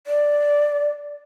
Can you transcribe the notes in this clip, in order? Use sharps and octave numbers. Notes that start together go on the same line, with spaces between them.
D5